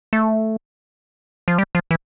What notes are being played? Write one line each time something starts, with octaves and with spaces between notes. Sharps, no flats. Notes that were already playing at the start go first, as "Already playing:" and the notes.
A3
F3
G3
F3
E3